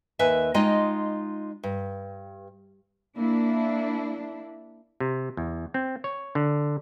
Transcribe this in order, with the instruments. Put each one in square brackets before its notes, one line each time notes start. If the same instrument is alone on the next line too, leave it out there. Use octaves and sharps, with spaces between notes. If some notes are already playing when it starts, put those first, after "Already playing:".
[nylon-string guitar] D#2 B4 E5 G#5
G#3 D#4 F4 D#5 G5
G2
[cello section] A#3 D4 E4
[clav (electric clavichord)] C3
E2
C4
C#5
D3